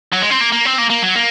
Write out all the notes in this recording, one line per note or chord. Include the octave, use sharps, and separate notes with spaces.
F#3
G#3
C4
A#3
A#3
C4
A#3
A#3
F#3
A#3